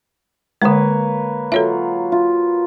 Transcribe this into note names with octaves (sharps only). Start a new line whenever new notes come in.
D3 G#3 A#3 B4 C#5
F#3 F4 A4 C#5 E5
F4